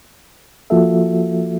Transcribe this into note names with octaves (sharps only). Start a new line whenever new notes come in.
F3 A#3 F4 F#4 A4 E5